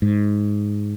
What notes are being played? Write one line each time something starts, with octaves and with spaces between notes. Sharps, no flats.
G#2